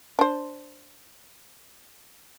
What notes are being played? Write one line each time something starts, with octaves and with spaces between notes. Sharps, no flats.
D4 C5